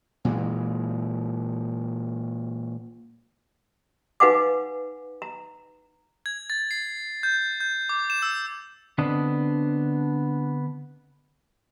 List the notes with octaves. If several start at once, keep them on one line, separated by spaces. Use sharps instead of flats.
A#2 E3 G#3
D#4 B4 F5 F#5 G#5 D6
A#5
G#6
A6
C7
G6
G6
D6
E7
E6
D3 B3 C4 D4 D#5